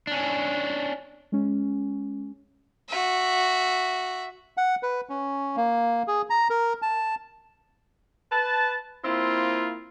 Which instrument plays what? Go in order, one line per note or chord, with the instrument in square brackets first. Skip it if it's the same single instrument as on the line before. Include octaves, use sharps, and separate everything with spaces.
[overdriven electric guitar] C#4 D4
[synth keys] G#3 C#4
[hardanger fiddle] F#4 E5
[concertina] F#5
B4
C#4
A#3
G#4
A#5
A#4
A5
[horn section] B4 A5
A#3 C4 E4 F4